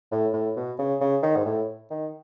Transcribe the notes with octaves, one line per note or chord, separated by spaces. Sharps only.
A2
A2
B2
C#3
C#3
D#3
G#2
A2
D#3